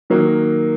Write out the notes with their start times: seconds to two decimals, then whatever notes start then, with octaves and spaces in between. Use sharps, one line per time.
0.10 D#3 F#3 A#3